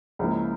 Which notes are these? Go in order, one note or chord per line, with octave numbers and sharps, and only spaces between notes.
C#2 C#3 F3 A#3 E4